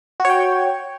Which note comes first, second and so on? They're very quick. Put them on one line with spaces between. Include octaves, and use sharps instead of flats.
F#4 C#5 G5